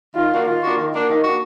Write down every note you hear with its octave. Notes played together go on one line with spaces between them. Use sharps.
D#3 F4
A#3 D4 F#4
D#3 F4
A#3 D4 F#4
D#3
A#3 D4 F#4
D#3
A#3 D4 F#4